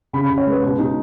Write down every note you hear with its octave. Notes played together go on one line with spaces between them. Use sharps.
C#3 B5
C#3 B5
C#5
G#3 B4
B2 F#4
B2 D#4